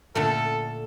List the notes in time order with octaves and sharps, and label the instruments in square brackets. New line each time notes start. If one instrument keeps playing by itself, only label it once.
[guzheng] A#2 D3 A3 [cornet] A4